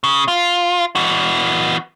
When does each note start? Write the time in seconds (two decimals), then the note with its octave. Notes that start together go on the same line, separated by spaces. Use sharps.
0.04 C#3
0.28 F4
0.96 E3 F#4